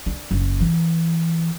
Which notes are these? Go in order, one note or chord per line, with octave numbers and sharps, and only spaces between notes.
D4
F#1
E3